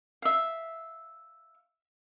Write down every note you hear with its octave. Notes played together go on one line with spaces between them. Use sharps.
E5 F5